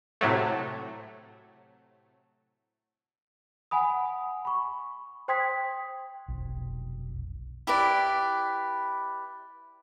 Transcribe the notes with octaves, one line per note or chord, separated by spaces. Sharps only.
A2 C3 F#3 A3
F#5 G#5 B5 D#6
B5 C#6
C5 G5 C6 D#6 G#6 B6
F1 B1
E4 G4 B4 D5